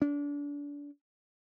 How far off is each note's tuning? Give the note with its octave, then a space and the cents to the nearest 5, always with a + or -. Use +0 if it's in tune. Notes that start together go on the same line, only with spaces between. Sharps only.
D4 -30